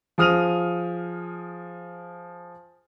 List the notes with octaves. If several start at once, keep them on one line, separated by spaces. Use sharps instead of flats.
F3 G#4 D#6 F6 D#7 F7